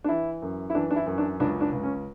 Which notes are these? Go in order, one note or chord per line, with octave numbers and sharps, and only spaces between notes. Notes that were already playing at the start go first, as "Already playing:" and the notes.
D4
E3 E4
F#2
E4
E3 D4
D4
E4
F#2
D4
C#2 D4
D4
C#2
C#4